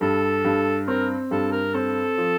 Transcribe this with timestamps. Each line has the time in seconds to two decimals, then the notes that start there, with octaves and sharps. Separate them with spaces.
0.01 G2 A4
0.45 G2
0.88 C4 A#4
1.31 G2 A4
1.52 A#4
1.74 C4 A4
2.18 F3